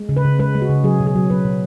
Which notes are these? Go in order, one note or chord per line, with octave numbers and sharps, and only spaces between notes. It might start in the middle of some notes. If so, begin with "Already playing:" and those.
Already playing: G#3
C#3
B4
C#3
G#3 B4
G#3
F#4
C#3
F#3 G#4
B2
G#4
F#3
F#3 B4
B2